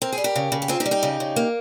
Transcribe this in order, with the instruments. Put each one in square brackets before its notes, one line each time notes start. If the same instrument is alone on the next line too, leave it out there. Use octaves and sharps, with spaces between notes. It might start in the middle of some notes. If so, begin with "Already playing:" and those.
[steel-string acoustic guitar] C4 A#4
G#4
G3
G4 A#4
C#3
C#3
G4
C4 F4 G#4
D#4 G4
G3
D#4 G4
C#3
C#3
A#3